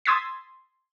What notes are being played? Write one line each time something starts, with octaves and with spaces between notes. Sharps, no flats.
C6 D#6 E6 G#6 A6 B6